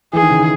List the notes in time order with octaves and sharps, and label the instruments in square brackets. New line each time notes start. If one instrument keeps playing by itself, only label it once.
[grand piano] E3 [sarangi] G#4
[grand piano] D#3
C#3
D#3